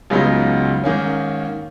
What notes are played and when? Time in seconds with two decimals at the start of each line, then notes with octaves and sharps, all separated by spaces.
0.10 C#2 C#3 F#3 B3 D#4
0.84 G#2 D#3 A#3 C#4